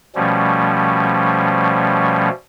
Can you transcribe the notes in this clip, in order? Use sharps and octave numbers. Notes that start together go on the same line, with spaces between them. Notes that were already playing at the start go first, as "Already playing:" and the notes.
B2 F3 G3 A3 C#4